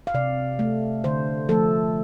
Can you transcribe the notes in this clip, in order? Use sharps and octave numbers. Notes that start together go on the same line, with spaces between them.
F5
C3 D5
A3
D3 C5
F3 A3 A4